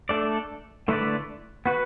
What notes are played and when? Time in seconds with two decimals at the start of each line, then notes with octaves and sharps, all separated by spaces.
0.09 A3 D4 A4 D5
0.88 D3 A3 E4 B4 D5
1.66 B3 F#4 B4